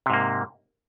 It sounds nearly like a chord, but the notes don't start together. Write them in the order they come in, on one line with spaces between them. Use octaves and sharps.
C3 G#2 A#3